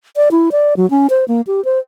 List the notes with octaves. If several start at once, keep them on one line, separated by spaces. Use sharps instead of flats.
D5
E4
D5
F#3
C#4
C5
A#3
G4
C5